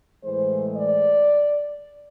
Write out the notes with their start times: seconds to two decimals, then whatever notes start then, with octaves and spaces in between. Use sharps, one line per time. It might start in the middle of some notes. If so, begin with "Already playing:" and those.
0.23 A2 E3 G#3 C5
0.76 D5